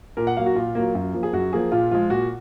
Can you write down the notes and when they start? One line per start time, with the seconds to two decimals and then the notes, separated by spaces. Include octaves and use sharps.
0.17 A#2 A#4
0.27 F#5
0.36 F#3 A#3 F5
0.46 F#4
0.55 A#2 F4
0.75 F#3 A#3
0.95 F#2
1.14 F3 A#3
1.23 G#4
1.33 F#2 F#4
1.53 F3 A#3 G#4
1.72 A#2 F4
1.91 F3 G#3 F4
2.10 A#2 F#4